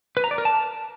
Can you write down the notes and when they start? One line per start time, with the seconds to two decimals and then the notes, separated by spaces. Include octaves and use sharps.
0.17 B4
0.24 A#5
0.31 D5
0.38 A#4
0.45 A5